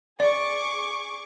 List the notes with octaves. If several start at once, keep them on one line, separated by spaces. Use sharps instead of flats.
G#4 D5 C#6 D6